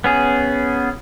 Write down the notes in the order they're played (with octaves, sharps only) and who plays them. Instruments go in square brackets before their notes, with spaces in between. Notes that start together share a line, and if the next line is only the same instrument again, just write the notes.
[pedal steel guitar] B3 C#4 G#4